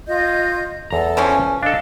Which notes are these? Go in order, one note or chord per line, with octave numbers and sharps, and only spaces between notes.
F4 D#5 G6
E2 A4 A#5
E3 F3 C#4
D4 A4 D#5 F5 E6